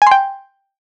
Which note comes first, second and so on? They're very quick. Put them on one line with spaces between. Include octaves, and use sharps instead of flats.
G#5 C6 G5